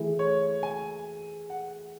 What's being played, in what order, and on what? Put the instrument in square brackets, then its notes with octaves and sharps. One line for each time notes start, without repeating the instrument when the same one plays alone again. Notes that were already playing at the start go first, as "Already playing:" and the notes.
Already playing: [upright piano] E3 A3 E4 G#4
[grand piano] C#5
G#5
F#5